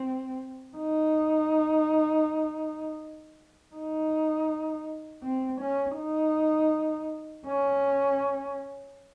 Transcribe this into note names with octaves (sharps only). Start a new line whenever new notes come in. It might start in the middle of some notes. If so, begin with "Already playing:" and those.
Already playing: C4
D#4
D#4
C4
C#4
D#4
C#4